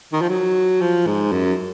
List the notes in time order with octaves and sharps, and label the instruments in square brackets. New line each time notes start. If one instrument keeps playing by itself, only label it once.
[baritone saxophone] D#3
F3
F#3
F3
G#2
F#2